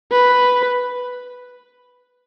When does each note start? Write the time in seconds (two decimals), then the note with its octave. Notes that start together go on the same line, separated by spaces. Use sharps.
0.12 B4